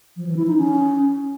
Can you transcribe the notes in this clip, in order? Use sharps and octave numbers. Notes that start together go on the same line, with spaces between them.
F3
E3
E4
D#4
C#4